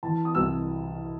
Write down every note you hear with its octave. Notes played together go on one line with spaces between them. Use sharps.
E3 A5
D#6
C2 E6